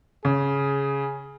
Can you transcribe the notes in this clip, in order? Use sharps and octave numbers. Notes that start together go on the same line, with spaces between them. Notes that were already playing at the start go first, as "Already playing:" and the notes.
C#3 G#4